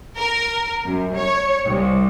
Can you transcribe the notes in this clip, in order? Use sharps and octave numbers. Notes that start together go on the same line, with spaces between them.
A#4
F#2
C#5
C2